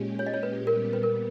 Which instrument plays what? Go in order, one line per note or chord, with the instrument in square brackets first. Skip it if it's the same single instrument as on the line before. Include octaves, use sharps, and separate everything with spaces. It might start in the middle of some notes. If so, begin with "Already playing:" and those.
Already playing: [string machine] A#2 G#3 C#4 G4
[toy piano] C#5
D#5
C#5
B4
[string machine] A#2 G3 B3 [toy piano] A#4
[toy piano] B4
A#4